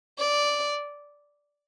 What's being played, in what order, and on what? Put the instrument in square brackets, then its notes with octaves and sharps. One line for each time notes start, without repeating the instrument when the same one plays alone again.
[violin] D5